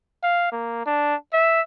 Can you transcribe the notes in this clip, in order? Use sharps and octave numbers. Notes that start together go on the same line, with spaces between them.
F5
A#3
D4
E5